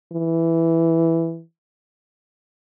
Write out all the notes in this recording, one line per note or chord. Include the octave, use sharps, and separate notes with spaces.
E3